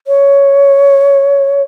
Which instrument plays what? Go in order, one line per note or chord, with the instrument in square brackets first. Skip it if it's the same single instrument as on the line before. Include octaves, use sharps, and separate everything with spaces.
[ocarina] C#5